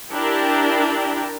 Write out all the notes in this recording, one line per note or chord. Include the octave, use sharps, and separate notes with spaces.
D4 E4 G4 A#4